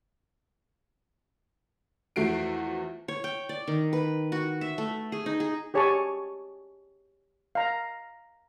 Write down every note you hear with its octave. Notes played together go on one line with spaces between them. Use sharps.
E2 F3 A3 F#4 C7 D7
C#5
G5
D5
D#3
B4
F#4
E5
A3
G#4
D#4
G#4
G4 G#4 C#5 G#5 A5 C#6
F5 A#5